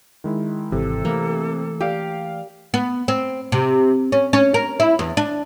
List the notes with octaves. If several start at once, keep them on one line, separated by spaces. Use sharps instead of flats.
D#3 G#3 E4
G#1 C3 E3 A4
E3 A3 A#3
G4 D5 F5 G5
B3
C4
C3
C#4
C#4
A#4
E4
E2
D4